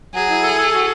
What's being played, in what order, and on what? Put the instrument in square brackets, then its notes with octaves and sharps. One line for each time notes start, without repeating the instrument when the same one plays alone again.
[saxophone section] F#3 [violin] G#4
[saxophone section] E4
A4
A4
F#4